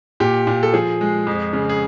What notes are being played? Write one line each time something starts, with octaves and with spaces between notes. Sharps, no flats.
A#2 G4
A#2
A4
F3 G#4
G#3
F2
C#3
G#4